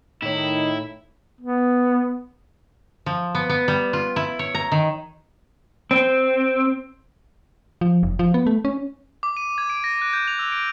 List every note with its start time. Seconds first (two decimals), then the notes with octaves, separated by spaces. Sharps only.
0.23 A2 D#3 D#4 E4 C#5
1.41 B3
3.06 F3
3.35 B3
3.50 B3
3.68 G3
3.93 F4
4.16 E4
4.39 C#5
4.55 A#5
4.72 D#3
5.91 C4
7.81 F3
8.03 F1
8.19 F3
8.34 B3
8.47 A3
8.65 C#4
9.23 D6
9.37 D#7
9.58 G#6
9.70 D7
9.84 A#6
10.02 F#6
10.13 G6
10.28 F7
10.39 E6
10.52 D7